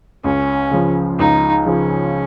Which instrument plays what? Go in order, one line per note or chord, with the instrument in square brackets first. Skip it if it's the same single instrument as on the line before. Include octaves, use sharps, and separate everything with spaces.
[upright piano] C#2 [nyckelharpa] C#4
[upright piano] C#3 F3
[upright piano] C#2 [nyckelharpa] D#4
[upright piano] C#3 F3 [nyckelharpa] C#4